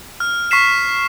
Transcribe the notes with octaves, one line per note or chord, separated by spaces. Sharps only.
F6
C#6 F6 B6 C7 E7